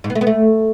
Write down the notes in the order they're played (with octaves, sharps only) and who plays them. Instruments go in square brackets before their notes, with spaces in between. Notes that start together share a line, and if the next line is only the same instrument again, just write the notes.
[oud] G#2
B3
A3
B3
A3